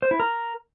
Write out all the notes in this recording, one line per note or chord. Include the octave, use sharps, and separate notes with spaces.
C5
E4
A#4